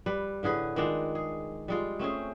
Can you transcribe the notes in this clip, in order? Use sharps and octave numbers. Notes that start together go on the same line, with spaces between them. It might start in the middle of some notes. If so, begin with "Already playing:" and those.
G3 B4
A2 D3 G#4 B4
D#3 G#3 D4 F4
G#4
G3 G#3 F4
A3 C4 C#4 G#4